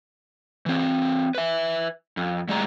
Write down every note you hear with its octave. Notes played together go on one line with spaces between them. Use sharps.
E3 C4
B4 E5
F2
A2 G3 G#3 D5 A#5